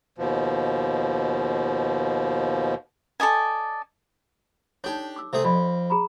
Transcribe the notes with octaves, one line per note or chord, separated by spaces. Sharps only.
D#2 B2 F3
A4 D5 D#5 G#5
D4 D#4 G4 A4 C#5
D6 E6
C3 A3 G#4
F2 D5 D#5 B5
G#4 A#5 B5